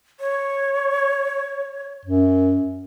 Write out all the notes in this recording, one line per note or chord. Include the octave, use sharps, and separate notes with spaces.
C#5
F#2